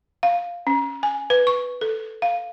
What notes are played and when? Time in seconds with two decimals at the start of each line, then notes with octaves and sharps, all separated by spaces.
0.23 F5
0.67 C#4
1.03 G#5
1.30 B4
1.47 C#6
1.81 A4
2.22 F5